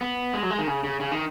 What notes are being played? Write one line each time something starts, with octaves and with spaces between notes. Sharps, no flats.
B3
G#3
F#3
G#3
D#3
C#3
C#3
C#3
D#3